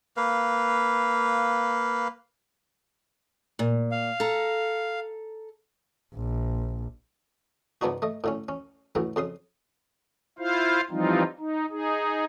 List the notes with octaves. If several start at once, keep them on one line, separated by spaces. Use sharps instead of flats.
A#3 B4 F5
A#2
F5
A4 A#5
A#1
C#2 G#2 B3 D4 D#4 F#4
A3 D#5
A2 D3 C#4
C#4
A2 C#3 E3 F#3
F2 C#3 C6 D#6
E4 F4 C5 F5
E3 F3 G3 C4 D#4 F4
D#4
D#4 G#4